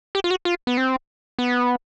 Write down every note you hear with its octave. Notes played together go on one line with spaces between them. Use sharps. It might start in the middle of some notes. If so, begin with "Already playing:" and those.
G4
F4
F#4
F4
B3
C4
B3